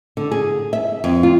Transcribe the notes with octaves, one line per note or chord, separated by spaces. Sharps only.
D3
G#4
E5
F2
F4